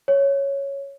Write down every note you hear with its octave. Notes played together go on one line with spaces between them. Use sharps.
C#5